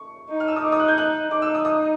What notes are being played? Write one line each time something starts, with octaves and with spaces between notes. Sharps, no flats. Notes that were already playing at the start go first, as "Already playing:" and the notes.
Already playing: C#6
D#4
F6
E6
D#6
D#4 D6
D#6
F#6
G6
F#6
D#4 D6
E6
D#6
D#6